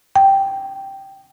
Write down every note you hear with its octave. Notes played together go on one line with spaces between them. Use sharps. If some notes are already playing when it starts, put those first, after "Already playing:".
G5